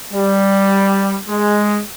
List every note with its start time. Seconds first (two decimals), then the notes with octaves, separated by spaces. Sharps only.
0.13 G3
1.28 G#3